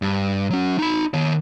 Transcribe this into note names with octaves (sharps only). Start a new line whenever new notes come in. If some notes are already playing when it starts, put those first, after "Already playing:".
G2
F#3 C#4
D#4 B5
D#3 C#5